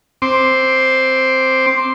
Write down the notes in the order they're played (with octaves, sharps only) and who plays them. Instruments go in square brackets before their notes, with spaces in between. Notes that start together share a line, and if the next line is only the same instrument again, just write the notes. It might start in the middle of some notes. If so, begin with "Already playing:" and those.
[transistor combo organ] C4 C6 D6